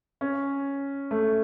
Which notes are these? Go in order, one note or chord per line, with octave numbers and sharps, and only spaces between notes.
C#4
A3